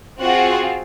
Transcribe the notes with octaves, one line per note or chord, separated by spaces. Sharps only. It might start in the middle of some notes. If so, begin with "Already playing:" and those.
C4 F4 F#4 G#4 F#5